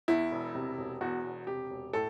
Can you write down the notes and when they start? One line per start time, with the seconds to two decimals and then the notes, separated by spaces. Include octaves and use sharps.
0.08 E2 E4
0.32 E1
0.55 C3
0.78 E1
1.01 E2 F#4
1.24 E1
1.47 C3 G4
1.70 E1
1.93 A2 A4